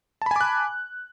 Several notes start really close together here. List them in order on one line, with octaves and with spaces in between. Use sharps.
A5 B5 G#5 D6 F#6